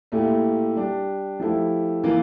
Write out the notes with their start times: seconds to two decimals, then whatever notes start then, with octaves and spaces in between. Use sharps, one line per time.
0.12 A#2 A3 E4 G4
0.76 G3 D4 G4
1.40 F3 A3 E4 G4
2.04 E3 A#3 F4